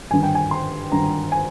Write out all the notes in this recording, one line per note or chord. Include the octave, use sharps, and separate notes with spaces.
G#1 G2 D3 G#5
G5
G#5
C6
G#1 G2 D3 A#5
G#5